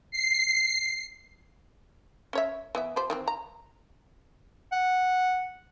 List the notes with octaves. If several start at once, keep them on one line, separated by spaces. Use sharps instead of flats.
C7
C#4 C#5 E5
E3 B3 E5
F3 G4 C5
D#3 E3 C4
A#5
F#5